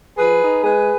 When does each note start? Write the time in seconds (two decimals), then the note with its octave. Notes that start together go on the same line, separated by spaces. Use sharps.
0.18 F3 G#4 B4
0.42 D#4
0.64 G#3 G#4 B4